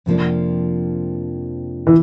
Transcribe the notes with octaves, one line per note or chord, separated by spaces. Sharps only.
F2 C3 F3 A#3 D4
E3